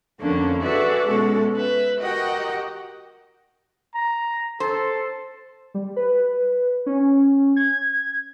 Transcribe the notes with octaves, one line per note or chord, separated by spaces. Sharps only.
F2 D3 F3 A#3 C#4 D4
F#4 G#4 A4 B4 D5 E5
B2 G#3 C#4 F#4 A4
B4 E5
F#4 G4 A#4 D#5 F#5 G5
A#5
A4 C5
G3
B4
C#4
G#6